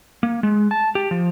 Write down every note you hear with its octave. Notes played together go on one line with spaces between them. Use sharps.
A#3
G#3
A5
G4
F3